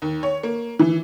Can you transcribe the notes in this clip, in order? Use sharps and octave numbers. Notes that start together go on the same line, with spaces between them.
D#2
C#5
A#3
E3